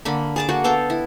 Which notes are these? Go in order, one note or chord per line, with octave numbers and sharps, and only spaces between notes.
D3 A#3 B5
G#4 A5 D6
A#3 F#4 F#5
B3 A4 F5 G5
E4